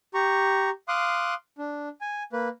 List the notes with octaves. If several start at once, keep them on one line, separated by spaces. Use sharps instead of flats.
G4 A#5 C#6
F5 C6 D6 D#6 F#6
D4
G#5
A#3 B4